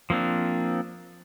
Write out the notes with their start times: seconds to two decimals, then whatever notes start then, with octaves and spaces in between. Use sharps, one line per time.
0.10 F3 A#3 C4 D4